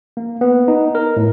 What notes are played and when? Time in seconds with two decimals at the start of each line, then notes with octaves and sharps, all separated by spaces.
0.17 A#3
0.41 B3
0.68 D#4
0.95 A#4
1.17 A2